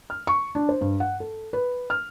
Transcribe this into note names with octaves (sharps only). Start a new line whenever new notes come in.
F6
C#6
D4
C5
G2
F#5
A4
B4
F6